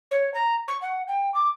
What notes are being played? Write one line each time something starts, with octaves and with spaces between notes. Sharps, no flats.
C#5
A#5
C#6
F#5
G5
D6